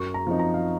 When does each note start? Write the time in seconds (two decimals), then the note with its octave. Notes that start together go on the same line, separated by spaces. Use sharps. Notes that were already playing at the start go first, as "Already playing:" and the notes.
Already playing: F#2 C#6
0.14 A#5
0.27 F3 C4 D#4
0.39 A#5
0.54 F5